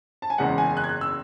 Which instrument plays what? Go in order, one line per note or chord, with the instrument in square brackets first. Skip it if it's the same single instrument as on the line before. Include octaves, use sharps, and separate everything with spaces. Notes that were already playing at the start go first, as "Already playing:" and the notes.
[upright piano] A5
G#5
F#1 E2 C#3 G#3 F#5
G#5
F#6
G#6
F#6
E6